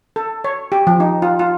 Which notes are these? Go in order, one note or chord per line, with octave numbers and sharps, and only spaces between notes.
A4
C#5
G4
F3
D#4
F4
F4